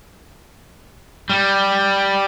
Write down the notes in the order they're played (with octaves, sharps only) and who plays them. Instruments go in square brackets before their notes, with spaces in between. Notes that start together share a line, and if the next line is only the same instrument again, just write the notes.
[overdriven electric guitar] G3